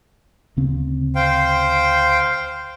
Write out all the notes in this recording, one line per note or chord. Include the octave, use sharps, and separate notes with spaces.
D2 C#3 C4
C5 F5 G5